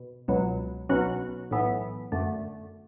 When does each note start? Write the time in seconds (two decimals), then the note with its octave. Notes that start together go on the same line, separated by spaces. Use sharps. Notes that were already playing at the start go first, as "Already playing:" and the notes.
Already playing: B2
0.28 C#2 B2 F#3
0.89 B1 B2 F#3 C#4 F#4
1.51 B1 A2 E3 B3
2.12 F#2 D3 A3